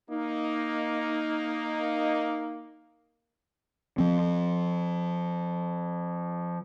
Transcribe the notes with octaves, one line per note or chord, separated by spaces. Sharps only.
A#3 D#4
F3 C4